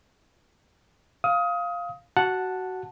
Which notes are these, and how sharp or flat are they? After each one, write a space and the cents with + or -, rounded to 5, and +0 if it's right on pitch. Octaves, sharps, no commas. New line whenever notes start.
F5 +0 D#6 +25
F#4 +15 F#5 -5 A5 +0